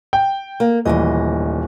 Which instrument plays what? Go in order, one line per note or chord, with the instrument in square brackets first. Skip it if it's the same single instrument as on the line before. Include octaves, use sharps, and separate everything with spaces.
[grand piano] G5
[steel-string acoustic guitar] A#3
[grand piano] D#1 E3 [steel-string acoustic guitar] D2 G#2 D#5